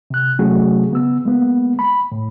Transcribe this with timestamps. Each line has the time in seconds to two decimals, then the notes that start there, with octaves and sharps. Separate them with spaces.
0.10 C3 F#6
0.39 C3 F#3 A3 C#4 F#4 G#4
0.91 C#3 B3 E6
1.25 G#3 A#3 B3
1.79 B5
2.12 A2